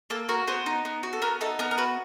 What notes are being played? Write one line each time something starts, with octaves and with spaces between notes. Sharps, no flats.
A#3 A4
F#4 A#4
B3 C5
D#4
B3
F#4
A4
B3 A#4
D#4 A4
B3 A#4
A#4
F#4 B4